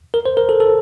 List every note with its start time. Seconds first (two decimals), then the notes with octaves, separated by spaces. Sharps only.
0.14 A#4
0.26 C5
0.37 A#4
0.49 A4
0.60 A4